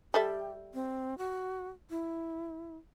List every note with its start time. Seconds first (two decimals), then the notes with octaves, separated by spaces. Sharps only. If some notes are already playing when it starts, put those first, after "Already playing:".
0.14 G3 G4 A4 E5
0.74 C4
1.18 F#4
1.90 E4